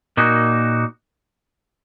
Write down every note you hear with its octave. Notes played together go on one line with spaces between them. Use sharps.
A#2 A#3 D#4 F#4